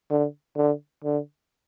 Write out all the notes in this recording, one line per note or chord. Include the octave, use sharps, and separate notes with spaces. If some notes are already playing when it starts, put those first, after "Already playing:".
D3
D3
D3